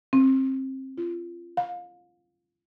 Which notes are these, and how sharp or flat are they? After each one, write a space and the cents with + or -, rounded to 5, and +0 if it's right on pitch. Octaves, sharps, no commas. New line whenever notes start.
C4 +25
F4 -25
F5 +30